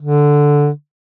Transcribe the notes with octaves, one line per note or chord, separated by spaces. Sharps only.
D3